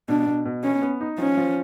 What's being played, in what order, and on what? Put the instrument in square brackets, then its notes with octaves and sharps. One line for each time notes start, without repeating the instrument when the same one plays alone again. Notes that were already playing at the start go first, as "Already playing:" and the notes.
[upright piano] B2 [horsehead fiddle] D4
[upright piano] B2
B2
[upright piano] B3 [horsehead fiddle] C#4
[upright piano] B3
D#4
[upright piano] F3 [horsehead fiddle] C#4
[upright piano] F3